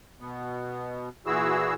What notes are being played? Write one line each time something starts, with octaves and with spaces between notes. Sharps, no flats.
B2 B3
A#2 E3 E4 F#4 G#4 E6